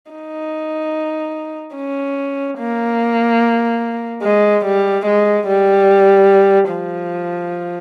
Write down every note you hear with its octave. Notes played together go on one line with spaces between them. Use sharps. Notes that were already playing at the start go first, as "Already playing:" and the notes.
D#4
C#4
A#3
G#3
G3
G#3
G3
F3